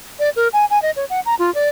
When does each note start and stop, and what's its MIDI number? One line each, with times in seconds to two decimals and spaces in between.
0.19 0.30 74
0.36 0.48 70
0.53 0.65 80
0.70 0.82 80
0.82 0.91 75
0.96 1.05 73
1.10 1.20 78
1.26 1.35 82
1.39 1.53 65
1.55 1.69 74